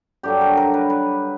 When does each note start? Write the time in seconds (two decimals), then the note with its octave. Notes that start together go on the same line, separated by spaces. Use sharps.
0.23 G2 D3 F#3 G4
0.41 A#4
0.57 A#4
0.74 B4
0.90 B4